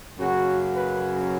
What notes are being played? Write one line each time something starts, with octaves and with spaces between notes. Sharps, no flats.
F#2 C#3 F#3 A#3 F#4
B4